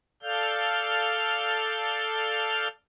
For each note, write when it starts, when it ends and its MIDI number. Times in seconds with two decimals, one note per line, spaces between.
0.22 2.68 69
0.22 2.68 74
0.22 2.68 77
0.22 2.68 89
0.22 2.68 91